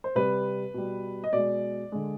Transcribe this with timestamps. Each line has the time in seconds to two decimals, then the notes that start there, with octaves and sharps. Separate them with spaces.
0.04 C5
0.15 C3 G3 B4
0.74 B2 G3
1.24 D#5
1.33 B2 G#3 D5
1.92 D3 G#3